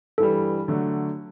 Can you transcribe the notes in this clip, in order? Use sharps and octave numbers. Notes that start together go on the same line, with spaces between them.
G2 E3 G3 A4
D3 F#3 A3